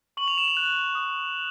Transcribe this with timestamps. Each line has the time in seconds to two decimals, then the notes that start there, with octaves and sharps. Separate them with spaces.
0.17 C#6 F#7
0.28 F7
0.38 E7
0.48 F7
0.57 F#6
0.95 D#6